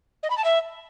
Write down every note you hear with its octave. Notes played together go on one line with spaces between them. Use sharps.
D#5
B5
A5
E5